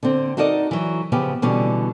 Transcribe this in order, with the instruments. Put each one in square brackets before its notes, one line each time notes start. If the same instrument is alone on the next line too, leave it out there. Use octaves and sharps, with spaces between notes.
[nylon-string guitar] D3 C4
D#4 F#4 A4 A#4 D5 D#5
E3 F#3
C#3 F3 B3 C#4 G4
B2 D3 E3 G3 C#4